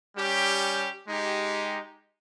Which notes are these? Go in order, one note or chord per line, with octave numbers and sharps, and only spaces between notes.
G3 C#4 G4
G#3 D#4 G4